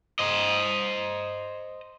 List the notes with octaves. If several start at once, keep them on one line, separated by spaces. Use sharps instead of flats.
C5 D#5